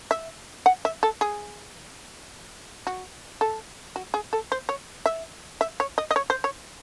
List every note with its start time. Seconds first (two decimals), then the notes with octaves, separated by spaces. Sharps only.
0.11 E5
0.66 F#5
0.85 E5
1.03 A4
1.21 G#4
2.87 F#4
3.41 A4
3.96 F#4
4.14 G#4
4.33 A4
4.52 C5
4.69 C#5
5.06 E5
5.61 E5
5.80 C#5
5.98 D#5
6.11 D#5
6.16 C#5
6.30 C5
6.44 C#5